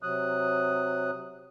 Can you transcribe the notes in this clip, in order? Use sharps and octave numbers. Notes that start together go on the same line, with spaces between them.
C3 F#3 D#6 F#6